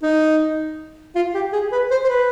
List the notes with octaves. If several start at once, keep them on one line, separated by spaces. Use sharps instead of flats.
D#4
F4
G4
G#4
B4
C5
C5
B4